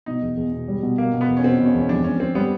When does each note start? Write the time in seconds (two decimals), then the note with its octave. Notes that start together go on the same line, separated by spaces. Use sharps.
0.06 B2 D#4
0.22 E2
0.37 E2
0.53 B2
0.68 G3
0.83 B2
0.98 B2 A#3
1.14 B2
1.21 B3
1.28 E2
1.37 C#4
1.44 B2 C4
1.59 B2
1.66 C#4
1.74 E2
1.81 C#4
1.89 F2 D4
2.04 F2 C#4
2.20 F2 C4
2.35 G3 B3